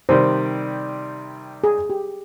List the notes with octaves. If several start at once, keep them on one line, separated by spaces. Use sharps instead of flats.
C3 D#3 G3 C5
G#4
G4